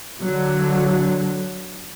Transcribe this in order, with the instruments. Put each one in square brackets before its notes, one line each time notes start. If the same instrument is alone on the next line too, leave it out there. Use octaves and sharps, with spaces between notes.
[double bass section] D3 F#3